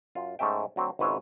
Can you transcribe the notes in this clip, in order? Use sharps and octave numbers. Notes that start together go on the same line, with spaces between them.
F#2 F4
G#2 A3 C#4 E5 G5
D2 F#3 C4
G#1 C#2 G#2 B4 C#5 E5